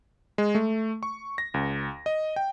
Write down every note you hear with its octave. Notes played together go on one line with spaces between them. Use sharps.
G#3
A3
C#6
A#6
C#2
D#5
G5